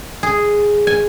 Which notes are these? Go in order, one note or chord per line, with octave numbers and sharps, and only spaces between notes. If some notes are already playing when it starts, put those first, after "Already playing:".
G#4
G#5